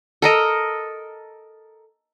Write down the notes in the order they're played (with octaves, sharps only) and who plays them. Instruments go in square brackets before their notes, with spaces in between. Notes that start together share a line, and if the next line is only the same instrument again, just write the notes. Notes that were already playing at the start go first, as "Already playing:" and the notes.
[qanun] A4 A#4 D#5